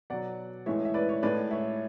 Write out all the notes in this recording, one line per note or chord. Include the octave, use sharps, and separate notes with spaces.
B2 F#3 D5 F#5
A2 E3 G#3 C#5 E5
E5
B4 D5
C#5
A2 G#3 B4 D5
C#5 E5